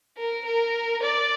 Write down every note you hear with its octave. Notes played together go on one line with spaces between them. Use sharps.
A#4
A#4
D5